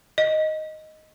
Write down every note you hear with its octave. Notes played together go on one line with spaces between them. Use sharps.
D#5